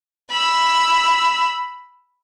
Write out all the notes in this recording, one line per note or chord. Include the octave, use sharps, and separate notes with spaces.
B5 E6